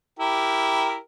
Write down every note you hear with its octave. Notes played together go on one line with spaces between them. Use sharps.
E4 G4 A#4